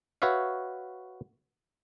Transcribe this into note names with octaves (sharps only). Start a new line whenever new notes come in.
F#4 B4 C#5 E5 F5